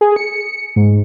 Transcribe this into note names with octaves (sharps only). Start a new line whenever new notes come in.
G#4
C#7
G#2